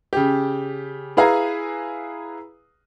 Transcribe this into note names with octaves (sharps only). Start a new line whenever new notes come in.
C#3 G4
E4 G#4 B4 F5 G#5 A#5